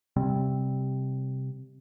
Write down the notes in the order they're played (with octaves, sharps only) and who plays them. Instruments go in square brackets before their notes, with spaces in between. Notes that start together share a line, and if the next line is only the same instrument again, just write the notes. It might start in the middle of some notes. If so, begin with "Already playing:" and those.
[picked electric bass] C3 G3 C4